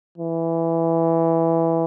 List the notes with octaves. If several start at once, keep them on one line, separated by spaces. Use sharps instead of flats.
E3